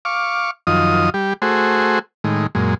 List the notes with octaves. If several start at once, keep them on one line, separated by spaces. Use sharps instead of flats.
F5 C#6 D6
F#2 D#3 F3 F4 D#5 D#6
G3 G4
A3 F#4 G#4 C5
A2 D#3 G#3
F#2 A#2 G#3